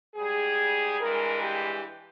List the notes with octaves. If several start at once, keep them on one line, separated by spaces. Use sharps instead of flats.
G#2 G3 G#4
G2 E3 G#3 A#4
G4